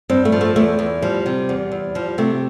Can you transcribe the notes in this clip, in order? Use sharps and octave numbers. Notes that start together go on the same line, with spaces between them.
G2 C4
A3
F3
A3
E2 A3
E2
F3 G3
C3
E2
E2
F3 G3
C3 A3